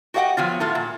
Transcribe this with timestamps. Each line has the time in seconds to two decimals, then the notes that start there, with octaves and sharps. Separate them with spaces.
0.14 F#4 G4 D#5 E5 F#5 G5
0.37 F3 F#3 B3 F4
0.60 A2 A3 F4
0.75 A#2